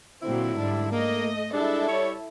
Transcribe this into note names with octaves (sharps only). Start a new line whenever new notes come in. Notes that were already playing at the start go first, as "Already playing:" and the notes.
A#2 D3 F#3 C4 E4
G#2 G3 D4
A3 A#3 D#5
G3 G#3 D4 E4 A4 E5
G3 C#5